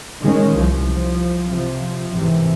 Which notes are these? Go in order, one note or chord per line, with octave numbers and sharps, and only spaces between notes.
D#3 G#3 C#4
C2 F3
F3
C3 F3
G#1 C3 E3